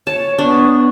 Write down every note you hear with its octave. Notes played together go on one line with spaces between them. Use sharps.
C#5 A5
B3 D4 C#6